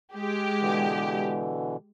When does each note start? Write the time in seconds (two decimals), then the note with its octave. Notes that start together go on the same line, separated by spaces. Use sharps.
0.16 G#3 G4
0.61 B2 D3 E3